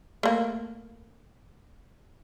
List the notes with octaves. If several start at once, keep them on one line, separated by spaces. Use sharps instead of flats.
A3 A#3